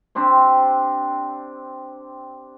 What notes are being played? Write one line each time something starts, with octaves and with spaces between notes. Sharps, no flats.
C4 D4 G4 C5